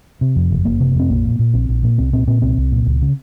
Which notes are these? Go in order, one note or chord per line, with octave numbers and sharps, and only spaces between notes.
C3
F2
F#1
F#1 A#3
C3
F2 C4
A#1 A#3
A#2
A#2
A#1 C4
A#1
A#2
C2 C4
A#2 C4
A#2 C4
C2 C4
C2
A#2
C#2
C#3